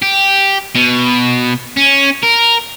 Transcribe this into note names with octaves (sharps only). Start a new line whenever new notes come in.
G4
B2
C#4
A#4